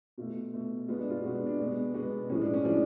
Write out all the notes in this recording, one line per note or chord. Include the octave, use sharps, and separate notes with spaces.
B2 A3 F4
B2 A3
B2 G#3 B3 F4
D4
F4
B2 G#3 B3 F#4
D4
D4
B2 G#3 B3
B2 G#3 B3
A2 F3 G#3 C#4
D4
C#4
A2 F3 G#3 D4